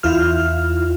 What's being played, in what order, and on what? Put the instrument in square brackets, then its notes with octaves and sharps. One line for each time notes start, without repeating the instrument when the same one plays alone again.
[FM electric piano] E2 E4 F4 F6